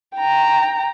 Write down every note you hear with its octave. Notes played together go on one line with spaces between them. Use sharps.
G5 A#5